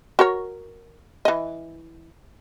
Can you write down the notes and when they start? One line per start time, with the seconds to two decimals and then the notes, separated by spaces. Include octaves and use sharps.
0.19 F#4 A#4 C#5
1.25 E3 D#5